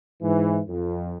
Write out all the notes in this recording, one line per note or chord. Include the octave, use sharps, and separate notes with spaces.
G#2 E3
F2